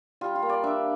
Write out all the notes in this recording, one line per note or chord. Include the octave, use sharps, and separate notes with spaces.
G3 F4
F4
A#3
D5
D4 E5